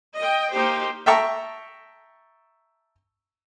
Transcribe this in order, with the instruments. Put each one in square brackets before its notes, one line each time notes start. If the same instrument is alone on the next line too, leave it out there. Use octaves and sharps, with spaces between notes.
[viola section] D#5 G5
A#3 D#4 G4 C5 G5
[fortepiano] E5 G5 A5 A#5 C#6